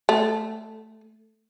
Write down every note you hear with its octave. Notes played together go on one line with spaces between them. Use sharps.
A3